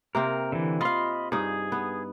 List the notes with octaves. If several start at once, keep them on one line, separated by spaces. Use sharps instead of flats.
C3 A#3 C4 A#4
D3 E3
F4 D#5 F5 B5 C6
G2 D#4 G#4
B3